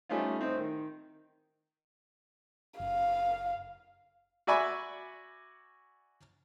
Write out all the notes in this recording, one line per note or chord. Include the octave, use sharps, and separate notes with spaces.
G3 A3 C#4 D#4 F4
A2 C4 D#4
D#3
F#1 F5
F#4 D5 E5 G#5 B5 C#6